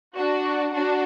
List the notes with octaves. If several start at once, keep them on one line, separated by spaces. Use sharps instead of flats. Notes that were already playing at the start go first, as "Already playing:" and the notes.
D4 F#4
D4 F#4